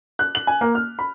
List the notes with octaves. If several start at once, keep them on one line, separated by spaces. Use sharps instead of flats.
F#6
F#7
G#5
A#3
F6
B5